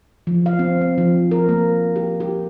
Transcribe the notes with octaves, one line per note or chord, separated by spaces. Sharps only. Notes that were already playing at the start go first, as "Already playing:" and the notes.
F3
F5
C4
C4
F3
A#4
A#3
G4
G4